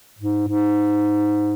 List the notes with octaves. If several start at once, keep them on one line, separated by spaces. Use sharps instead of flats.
G#2
G#2